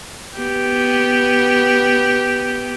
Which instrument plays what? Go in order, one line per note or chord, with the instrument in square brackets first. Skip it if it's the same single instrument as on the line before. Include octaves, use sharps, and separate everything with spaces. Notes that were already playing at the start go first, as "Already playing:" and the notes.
[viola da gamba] B3 G4